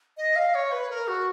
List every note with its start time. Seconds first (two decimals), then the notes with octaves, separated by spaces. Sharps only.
0.17 D#5
0.36 F5
0.54 C#5
0.72 B4
0.90 A#4
1.08 F#4